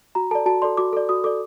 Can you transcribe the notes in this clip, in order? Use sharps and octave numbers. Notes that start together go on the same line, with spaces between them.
F#4 A#5
A4 D5 A5
F#4 A5
A4 D5 C6
F#4 D6
A4 D5
F#4 D#6
A4 D5 D6